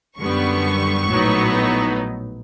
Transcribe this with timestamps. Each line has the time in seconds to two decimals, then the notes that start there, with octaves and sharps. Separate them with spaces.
0.18 F#2 D3 G3 B3 C#6
1.07 A#1 A2 F#3 B3 D#4